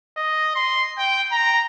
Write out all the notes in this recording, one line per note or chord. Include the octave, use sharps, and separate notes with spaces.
D#5
C6
G5
A#5